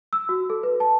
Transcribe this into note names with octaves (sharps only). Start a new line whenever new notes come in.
E6
F#4
A4
B4
A5